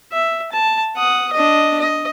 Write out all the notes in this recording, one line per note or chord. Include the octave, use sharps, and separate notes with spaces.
E5
A5
F#5 D#6
D4 D#5
D#5